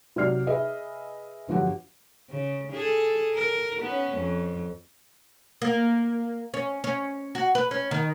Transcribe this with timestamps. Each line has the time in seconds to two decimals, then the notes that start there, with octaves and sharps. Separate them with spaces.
0.16 C3 F#3 D5 F6 C7
0.47 G#4 B4 D#5 E5
1.48 G1 F3 F#3 F#4 G4 F#5
2.30 C#3
2.73 G#4 A4
3.34 A#4
3.83 B3 C#4
4.18 F2
5.62 A#3
6.54 C#4
6.84 C#4
7.35 F#4
7.55 B4
7.71 C#4
7.91 D#3